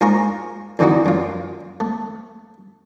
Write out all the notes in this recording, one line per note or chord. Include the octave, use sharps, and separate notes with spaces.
G#2 F4 A#4 G#5 A#5 C#6
F2 D3 E3 D#4 E4 F#4
F#2 F4
A3